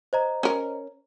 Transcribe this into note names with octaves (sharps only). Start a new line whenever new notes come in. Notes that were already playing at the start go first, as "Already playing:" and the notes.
C5 D#5 A#5
C#4 A#4